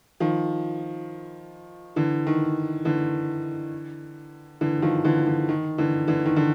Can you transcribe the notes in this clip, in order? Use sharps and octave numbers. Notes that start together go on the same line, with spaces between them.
D#3 F3
D3 E3
D#3
D3 E3
D3 E3
D#3 F3
D3 E3
D3
D#3
D3 E3
D3 E3
D#3
D3 E3